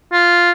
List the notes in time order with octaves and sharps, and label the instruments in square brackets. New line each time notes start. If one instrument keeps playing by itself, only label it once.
[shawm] F4